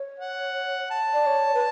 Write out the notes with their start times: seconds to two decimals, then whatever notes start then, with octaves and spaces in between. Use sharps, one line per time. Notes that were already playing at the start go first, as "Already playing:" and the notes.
Already playing: C#5
0.20 F#5
0.91 A5
1.13 D5
1.26 C#5
1.54 B4